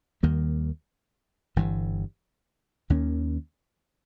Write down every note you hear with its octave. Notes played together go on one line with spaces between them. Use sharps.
D#2 D#3 G3 A#3
G1 G2 E3
D#2 D#3 A#3 C#4